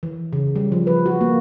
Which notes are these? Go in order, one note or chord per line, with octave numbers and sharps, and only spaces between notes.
E3
C#3
G3
F3
B4
F#4
A#3